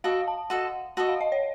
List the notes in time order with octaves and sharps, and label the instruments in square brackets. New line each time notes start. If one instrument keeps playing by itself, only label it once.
[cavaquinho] F#4 A4 D#5 [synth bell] F5
[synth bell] A5
[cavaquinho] F#4 A4 D#5 [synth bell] F#5
[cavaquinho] F#4 A4 D#5 [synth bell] F#5
[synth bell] F5
D#5
C#5